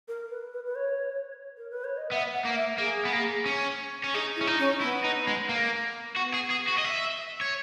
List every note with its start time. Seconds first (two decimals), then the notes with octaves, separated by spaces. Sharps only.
0.08 A#4
0.31 B4
0.53 B4
0.66 B4
0.75 C#5
1.58 A#4
1.70 B4
1.84 C#5
1.97 D#5
2.12 B3 E5
2.33 F#5
2.45 A#3
2.56 E5
2.78 A#3 G#4
3.05 B3
3.13 A#3
3.46 C#4
4.04 C#4
4.14 D#4 G#4
4.36 E4
4.41 C#4
4.47 D#4
4.59 C#4
4.81 B3 E4
5.04 D#4
5.27 G#3
5.49 A#3
6.16 B3 F#4
6.34 G#4
6.50 G#4
6.68 F#4
6.78 D#5
6.84 E5
7.41 C#5